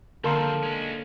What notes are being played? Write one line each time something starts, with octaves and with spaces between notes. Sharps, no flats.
D3 F3 G3 A#3 A4 A#4 C6
G#3 C#4